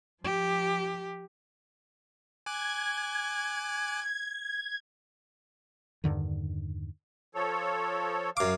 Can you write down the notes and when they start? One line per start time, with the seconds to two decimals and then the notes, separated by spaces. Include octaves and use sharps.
0.23 F3 G4
2.46 G#5 D6 F#6 G#6
6.04 E2 G2 D3 D#3
7.35 F3 A4 C#5
8.37 F#2 F5 D6